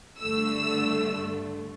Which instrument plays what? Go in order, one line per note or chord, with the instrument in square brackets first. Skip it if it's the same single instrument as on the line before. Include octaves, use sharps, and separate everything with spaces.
[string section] G2 D3 A3 E6